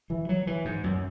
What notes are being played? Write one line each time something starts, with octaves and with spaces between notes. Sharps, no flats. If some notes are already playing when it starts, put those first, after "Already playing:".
E3
F#3
E3
G#2
F#2